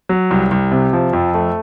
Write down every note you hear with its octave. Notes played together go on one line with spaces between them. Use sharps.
F#3
C2
C2
C3
F3
F2
A3